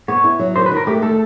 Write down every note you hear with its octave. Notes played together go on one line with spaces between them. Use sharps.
B3 C#5
E4
F#3
D#3 C5
B4
D#3
A#4
A3 G4
A3 A4